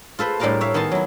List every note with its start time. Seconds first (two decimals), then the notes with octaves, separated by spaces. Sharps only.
0.19 F4 A4 B4 C5
0.39 A2 G3 D4 A#4 F5 A5
0.61 C#5 E5 F5
0.74 D#3 B3 G#5 A5 C6
0.91 F#3 E4